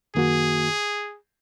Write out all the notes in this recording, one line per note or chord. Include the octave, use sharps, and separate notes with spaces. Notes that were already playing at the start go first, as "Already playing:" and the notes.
F#2 D#3 A#3 F#4 G#4